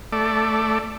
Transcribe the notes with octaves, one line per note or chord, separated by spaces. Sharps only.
A3 D5